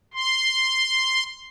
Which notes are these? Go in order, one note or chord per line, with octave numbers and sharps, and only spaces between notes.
C6